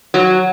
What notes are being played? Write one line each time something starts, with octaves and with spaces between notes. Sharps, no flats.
F#3